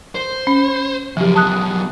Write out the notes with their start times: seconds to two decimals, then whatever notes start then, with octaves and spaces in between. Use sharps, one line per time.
0.15 C5
0.47 C#4
1.17 C#3 F3 F#3 G4
1.35 E2 F#3 A5 D#6 F#6